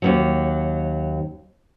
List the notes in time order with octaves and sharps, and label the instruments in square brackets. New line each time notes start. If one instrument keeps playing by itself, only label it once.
[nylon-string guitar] D#2 G#2 F#3